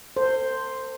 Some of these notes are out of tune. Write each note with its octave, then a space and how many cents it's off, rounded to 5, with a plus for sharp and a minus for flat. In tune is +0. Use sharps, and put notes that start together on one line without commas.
A4 +45 C5 +0